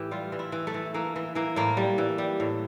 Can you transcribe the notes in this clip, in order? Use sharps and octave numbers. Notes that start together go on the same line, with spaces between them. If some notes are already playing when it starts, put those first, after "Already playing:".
Already playing: A2 E3 G4
G3 F4
E3
E4
E3
A3
E3
E3 A#3
E3
E3 A#3
A2 A#3
G3
E3
G3
A2